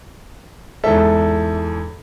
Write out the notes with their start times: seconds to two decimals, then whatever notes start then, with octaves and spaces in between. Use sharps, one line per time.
0.84 E2 G#2 A4 E5